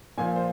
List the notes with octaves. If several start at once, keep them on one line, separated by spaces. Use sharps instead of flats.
A#2 F3 G#5
C5